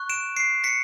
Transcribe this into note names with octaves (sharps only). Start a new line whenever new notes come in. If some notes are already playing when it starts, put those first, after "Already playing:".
Already playing: C#6 F#6
D7 E7
C7 D7
B6 C#7